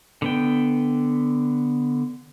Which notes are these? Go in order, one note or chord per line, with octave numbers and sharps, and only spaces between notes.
D3 B3 G5